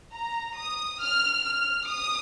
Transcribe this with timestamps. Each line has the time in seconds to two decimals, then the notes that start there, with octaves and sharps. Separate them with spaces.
0.14 A#5
0.57 D#6
1.02 F6
1.45 F6
1.89 D#6